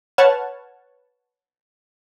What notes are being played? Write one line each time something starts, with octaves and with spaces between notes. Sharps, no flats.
B4 C#5 F#5 A5 F6 G#6